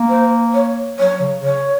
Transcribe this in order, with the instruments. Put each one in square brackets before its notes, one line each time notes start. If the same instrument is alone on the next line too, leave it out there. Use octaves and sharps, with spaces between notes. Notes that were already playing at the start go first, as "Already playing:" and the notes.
Already playing: [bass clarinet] A#3
[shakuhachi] C5
C#5
[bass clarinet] F#3 [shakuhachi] C#5
[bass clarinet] C#3
[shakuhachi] C#5